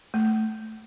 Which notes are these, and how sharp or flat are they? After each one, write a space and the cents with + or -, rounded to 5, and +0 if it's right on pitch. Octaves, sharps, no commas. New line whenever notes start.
A3 +0